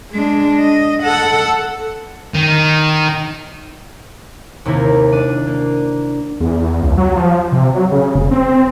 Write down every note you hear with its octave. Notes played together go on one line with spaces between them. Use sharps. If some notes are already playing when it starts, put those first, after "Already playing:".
G#3 D4
D#5
A4 F#5
D#3
D#2 C3 A#3 E4 A#5
D4 D5 D#7
A#3
E2
E2
C#2
F#3
F3
C3
F#3
C#3
F1
C4